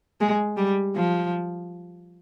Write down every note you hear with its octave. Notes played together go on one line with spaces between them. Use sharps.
G#3
G3
F3